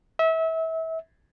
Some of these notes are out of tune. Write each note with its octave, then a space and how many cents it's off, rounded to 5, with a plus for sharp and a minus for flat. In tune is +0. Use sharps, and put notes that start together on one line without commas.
E5 -30